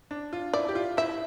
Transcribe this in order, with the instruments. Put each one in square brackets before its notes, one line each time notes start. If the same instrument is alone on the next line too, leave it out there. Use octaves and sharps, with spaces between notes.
[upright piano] D4
F4
[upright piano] E4 [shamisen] D5
[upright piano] G4
F4
[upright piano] E4 [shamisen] E5